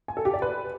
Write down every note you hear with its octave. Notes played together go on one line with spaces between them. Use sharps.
G#5
A4
G4
D5
B4